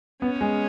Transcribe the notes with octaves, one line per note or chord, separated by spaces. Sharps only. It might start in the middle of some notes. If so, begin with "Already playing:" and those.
B3 C#4
G#3